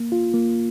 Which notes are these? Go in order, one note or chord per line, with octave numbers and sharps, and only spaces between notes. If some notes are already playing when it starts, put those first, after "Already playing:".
Already playing: A#3
F4
A#3